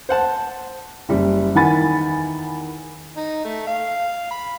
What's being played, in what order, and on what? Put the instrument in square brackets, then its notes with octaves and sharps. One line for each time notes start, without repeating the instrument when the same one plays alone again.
[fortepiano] C5 F#5 A5
[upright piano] F#1 G3
E2 D#3 F#5 G#5 B5 A6
[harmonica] D#4
A3
F5
B5